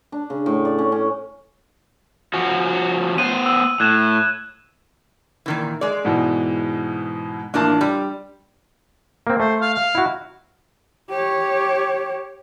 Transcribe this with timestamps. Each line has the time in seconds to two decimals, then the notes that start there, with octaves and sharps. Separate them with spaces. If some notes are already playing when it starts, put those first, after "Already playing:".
0.12 D4
0.30 C#3
0.46 A2
0.65 D5
0.79 C#4
0.92 C#4
2.34 F3 C#4 F#4
3.18 B3 C5 D#7
3.46 E6
3.80 A2 F#6 G#6 E7
5.46 A#2 D#3 E3
5.81 G#3 D5
6.05 G#2 B2 E3
7.54 A1 F3 A#3 D4 F4 A5
7.81 G3 D5
9.27 A#3 C4
9.40 A3 C5
9.61 F5
9.74 F5
9.95 E4 F#4
11.10 G4 C#5